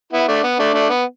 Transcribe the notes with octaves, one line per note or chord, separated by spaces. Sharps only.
B3 E4
A3 D4
B3
A3 D4
A3 D4
B3